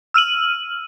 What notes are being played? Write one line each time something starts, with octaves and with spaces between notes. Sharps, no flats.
E6 F6 D#7 F#7